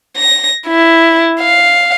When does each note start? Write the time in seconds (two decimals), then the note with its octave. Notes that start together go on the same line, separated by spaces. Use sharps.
0.17 A#6
0.67 E4
1.41 F5